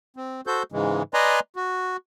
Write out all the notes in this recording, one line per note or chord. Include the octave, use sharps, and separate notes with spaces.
C4
F#4 A4 C5 G6
G#2 C#3 E3 G#3
B4 D5 D#5 G#5 A#5 C6
F#4